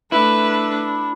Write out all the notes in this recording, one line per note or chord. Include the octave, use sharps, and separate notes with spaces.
A3 D4 E4 B4